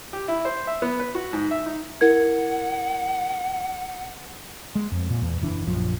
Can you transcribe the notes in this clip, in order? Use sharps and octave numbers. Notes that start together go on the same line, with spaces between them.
G4
E4
C5
E5
B3
B4
F#4
G#2
E5
D#4
E4 A#4 F#5 G#6
G#3
F2
A#2
E2
F#1 E3 D4
A#1 F#2 F3